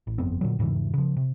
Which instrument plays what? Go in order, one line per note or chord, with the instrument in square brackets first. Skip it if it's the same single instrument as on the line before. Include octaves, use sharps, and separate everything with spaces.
[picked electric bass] A1
G1 F2 B3 C4
A#2 D3 F#3
E2 G#2 C#3 E3
C#3 F3
C3